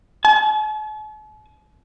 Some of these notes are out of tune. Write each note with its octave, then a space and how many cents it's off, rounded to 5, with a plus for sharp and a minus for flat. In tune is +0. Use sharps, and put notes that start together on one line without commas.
A5 -45